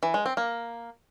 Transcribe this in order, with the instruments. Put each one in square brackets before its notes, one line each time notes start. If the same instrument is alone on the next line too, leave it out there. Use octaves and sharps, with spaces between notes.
[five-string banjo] E3
G#3
C4
A#3